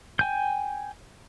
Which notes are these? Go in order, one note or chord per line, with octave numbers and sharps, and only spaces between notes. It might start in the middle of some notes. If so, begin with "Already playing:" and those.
G5 G#5 G6